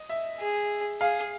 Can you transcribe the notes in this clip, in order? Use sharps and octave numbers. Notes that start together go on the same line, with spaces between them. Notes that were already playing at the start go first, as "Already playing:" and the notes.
Already playing: D#5
E5
G#4
G#4 F5